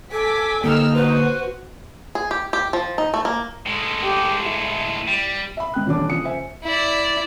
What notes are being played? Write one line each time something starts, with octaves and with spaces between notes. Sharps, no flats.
A4 G#5 D6 B6
D3 A#3 D#4 G4 A4 E6 F6
F#4 B4 C5
G#4
G4
G4
F3
D#4
A3
A#3
A2 G#3
G4
E4
G3
E5 B5
G#2 G5 F#6
D#1 E2 B2 C#4 D4 D6
F2 C#3 D#6 C#7
C5 E5 G#5
E4 D5